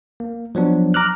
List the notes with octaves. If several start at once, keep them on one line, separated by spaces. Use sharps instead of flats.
A#3
F3 F#3 B3 D4
A#5 D6 F6 F#6